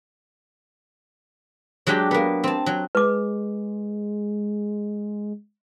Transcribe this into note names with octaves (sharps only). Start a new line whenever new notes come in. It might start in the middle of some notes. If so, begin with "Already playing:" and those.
F#3 G#3 D4 G4
A#3 B3
C4 A5
F#3
G#3 B4 D6